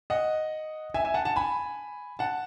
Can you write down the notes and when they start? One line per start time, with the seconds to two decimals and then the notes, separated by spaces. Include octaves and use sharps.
0.10 D#5 F#5
0.94 E5 G#5
1.05 E5 G#5
1.14 F#5 A5
1.25 F#5 A5
1.36 G#5 B5
2.19 F#5 A5